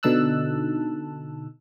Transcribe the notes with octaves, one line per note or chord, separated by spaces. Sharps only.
B2 D3 D#4 A5 E6 F#6